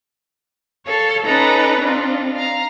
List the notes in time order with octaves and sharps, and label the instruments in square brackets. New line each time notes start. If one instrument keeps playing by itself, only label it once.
[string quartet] A4 C#5 F5
C#4 D#4 A4 B4 D5 A#5
C4 D4 D#4 F4
F5 A#5